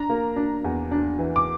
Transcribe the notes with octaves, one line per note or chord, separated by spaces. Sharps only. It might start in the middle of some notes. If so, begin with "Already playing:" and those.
Already playing: D4 A#5
A#3
D4
E2
D4
E3
D6